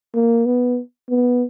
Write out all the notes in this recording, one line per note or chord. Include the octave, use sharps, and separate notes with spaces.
A#3
B3
B3